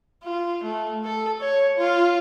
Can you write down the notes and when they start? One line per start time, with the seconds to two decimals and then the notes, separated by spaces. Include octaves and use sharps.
0.23 F4
0.64 A3
1.04 A4
1.41 C#5
1.77 F4